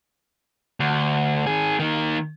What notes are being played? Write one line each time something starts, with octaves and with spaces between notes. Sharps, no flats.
D2
D#3 G#4
D#3 A#3